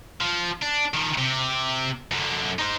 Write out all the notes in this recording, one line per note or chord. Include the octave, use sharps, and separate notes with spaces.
F3
D4
D#3 F3
C3 G4
F#2 D3
D#4 C5